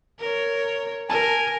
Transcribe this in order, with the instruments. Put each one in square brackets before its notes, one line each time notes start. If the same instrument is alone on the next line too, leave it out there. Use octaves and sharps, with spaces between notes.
[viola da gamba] A#4 C#5
[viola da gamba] A#4 [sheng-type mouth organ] G#5 [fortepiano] A5